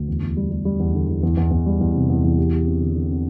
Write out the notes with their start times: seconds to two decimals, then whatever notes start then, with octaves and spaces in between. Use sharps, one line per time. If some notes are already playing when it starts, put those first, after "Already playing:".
Already playing: D2
0.08 E2
0.22 E2
0.37 G3
0.51 G3
0.65 G3
0.80 E2
0.94 D3
1.08 E2
1.23 E2
1.37 E2
1.51 E2
1.66 G3
1.81 E2
1.95 C3
2.09 E2
2.24 E2
2.38 G4
2.52 G4
2.66 C4
2.81 D3
2.95 D3
3.10 C4